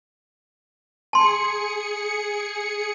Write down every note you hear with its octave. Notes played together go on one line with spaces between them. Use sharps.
G#4 A5 C6 C#7